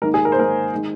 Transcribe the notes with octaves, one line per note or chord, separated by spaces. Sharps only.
G#2 D#3 A#3 A#4
G#4
A#4
C5
G#2 D#3 A#3 A#4
D#3 G#3